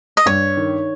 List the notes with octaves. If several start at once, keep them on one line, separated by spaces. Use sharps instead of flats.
D#5
G2 C#5
D#3